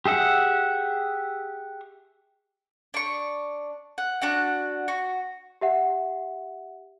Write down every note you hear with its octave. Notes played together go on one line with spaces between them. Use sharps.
G4 G#4 E5 F#5
D4 C#6
F#5
D4 F#4 F#5
F#4
G4 E5 F#5